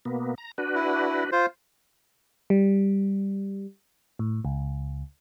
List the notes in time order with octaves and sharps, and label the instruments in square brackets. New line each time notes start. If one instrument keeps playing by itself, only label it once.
[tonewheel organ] B2 A#3 B3
A#5
D4 F#4 B4
[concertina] E4
F4 C5
[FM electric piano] G3
A2
C#2